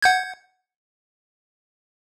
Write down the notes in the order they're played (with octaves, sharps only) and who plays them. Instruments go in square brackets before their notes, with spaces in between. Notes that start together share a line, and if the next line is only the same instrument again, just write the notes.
[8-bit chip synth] F#5 G6 G#6